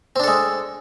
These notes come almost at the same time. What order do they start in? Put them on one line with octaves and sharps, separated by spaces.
C4 D4 A4 G#3